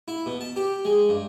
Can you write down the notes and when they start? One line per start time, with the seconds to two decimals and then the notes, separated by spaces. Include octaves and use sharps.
0.08 E4
0.26 B2
0.41 A5
0.56 G4
0.85 G#3
1.09 G2